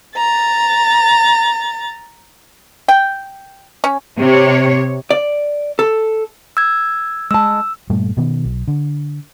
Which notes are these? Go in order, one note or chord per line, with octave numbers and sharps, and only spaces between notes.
A#5 A6
G5
C#4
C3 C#5
D5
A4
E6 G#6
G#3 A5 E6
G2 A#2 G3 A3
B2 D#3 B3
B1
D3